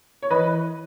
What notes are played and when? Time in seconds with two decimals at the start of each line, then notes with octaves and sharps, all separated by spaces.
0.22 C#5
0.31 E3 B4 D#5